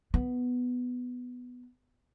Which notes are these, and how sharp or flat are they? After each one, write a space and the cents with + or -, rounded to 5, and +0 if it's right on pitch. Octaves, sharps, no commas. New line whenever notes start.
B3 +5